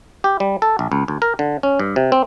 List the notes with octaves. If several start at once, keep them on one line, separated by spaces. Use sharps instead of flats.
G4
G3
A4
A#1
C#2
D2
A#4
D3
C#4
G2
C3
C4